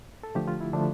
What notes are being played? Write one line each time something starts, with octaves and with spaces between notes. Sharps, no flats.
A4
D3 F3 A3 G4
F4
E4
D3 F3 A3 D4